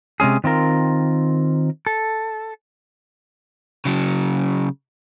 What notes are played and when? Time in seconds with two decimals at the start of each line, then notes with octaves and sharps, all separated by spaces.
0.20 C3 G#3 C#4 G#4
0.44 D#3 C4 F4 A#4
1.87 A4
3.85 C#3 F#3